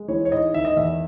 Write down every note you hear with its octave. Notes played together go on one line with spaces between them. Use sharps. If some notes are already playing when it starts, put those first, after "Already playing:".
Already playing: G#3
E3 C#5
C#5
G#2 D#5
D#3 E5
D#5
E2 E5